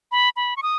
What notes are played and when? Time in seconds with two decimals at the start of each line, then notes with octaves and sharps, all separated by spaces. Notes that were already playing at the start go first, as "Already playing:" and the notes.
0.12 B5
0.36 B5
0.57 C#6
0.63 D#6